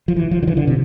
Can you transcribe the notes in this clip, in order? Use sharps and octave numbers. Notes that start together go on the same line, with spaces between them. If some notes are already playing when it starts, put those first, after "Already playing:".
F3
E3
F3
D3
E3
D3
C3